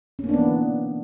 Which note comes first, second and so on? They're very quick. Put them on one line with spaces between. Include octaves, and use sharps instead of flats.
C#4 A#3 D4 B3 E3